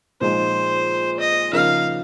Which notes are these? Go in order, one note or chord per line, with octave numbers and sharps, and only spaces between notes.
A#2 F3 G#3 D#4 C5
D#5
C#3 F3 A#3 D#4 F5